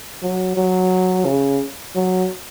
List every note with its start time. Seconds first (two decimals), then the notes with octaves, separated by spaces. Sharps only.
0.22 F#3
0.57 F#3
1.26 C#3
1.95 F#3